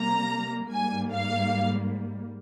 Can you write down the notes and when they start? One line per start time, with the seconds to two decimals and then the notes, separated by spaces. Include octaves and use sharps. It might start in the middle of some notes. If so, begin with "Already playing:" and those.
Already playing: C3 G3 A#3 A#5
0.71 G#2 G3 A#3 G#5
1.10 F5